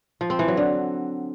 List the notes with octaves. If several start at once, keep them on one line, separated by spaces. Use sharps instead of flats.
F3
C4
E3
F#3
D3